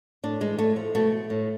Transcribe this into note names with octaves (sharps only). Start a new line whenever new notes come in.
A2 D4
E3 G#3
A2 A3
F3
B2 A3
A2